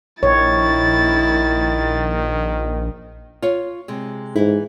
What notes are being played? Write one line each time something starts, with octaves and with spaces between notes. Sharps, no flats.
A#1 D#3 E4 C#5 A6
F4 C#5
C3 G#3
G#2 E3 D#4 E4